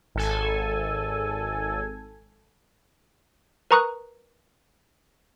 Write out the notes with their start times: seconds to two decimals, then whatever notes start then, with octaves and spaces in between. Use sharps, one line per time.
0.15 G#1 A4 G#5
3.71 A#4 B4 A#5 C#6 D#6 F#6